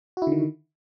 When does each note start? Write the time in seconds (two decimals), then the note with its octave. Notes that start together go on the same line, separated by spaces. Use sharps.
0.17 F#4
0.22 E4
0.27 D3
0.32 D#3